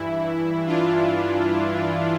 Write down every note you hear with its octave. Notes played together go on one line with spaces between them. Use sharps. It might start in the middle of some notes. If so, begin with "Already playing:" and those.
Already playing: G2 E3 E4
D4 F4